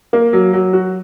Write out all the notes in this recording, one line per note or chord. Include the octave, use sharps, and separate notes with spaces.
A#3
F#3
F#3
F#4